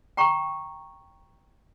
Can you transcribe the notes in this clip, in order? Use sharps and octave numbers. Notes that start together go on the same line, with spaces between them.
G5 A#5 C#6